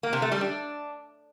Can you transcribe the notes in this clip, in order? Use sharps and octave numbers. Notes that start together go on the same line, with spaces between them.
A#3
C3
A3
G3
D4